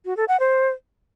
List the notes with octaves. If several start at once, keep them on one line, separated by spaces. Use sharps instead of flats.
F#4
A4
F#5
C5